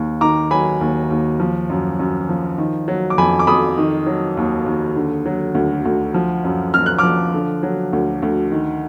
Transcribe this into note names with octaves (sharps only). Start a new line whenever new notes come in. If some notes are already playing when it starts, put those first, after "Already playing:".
Already playing: D#2
D#3 A#5 D6
F#3 G#5 B5
D#2
D#2
F3
F#2
F#2
F3
D#3
F#3
D6
F2 G#5 B5
D6
F2 B5 D#6
D#3
F#3
D#2
D#2
D3
F#3
D2
D2
F3
F#2
F#2 F6
F#6
F3 D6 F6
D3
F#3
D2
D2
D#3